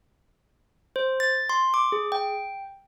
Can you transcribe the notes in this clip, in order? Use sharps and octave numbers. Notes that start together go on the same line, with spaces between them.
C5
A6
C6
D6
G#4
G5